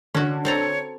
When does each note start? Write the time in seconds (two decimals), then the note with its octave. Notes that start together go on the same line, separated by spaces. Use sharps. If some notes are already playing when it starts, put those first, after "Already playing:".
0.15 D3 C#4 F#4
0.45 C4 A4 C#5 A#5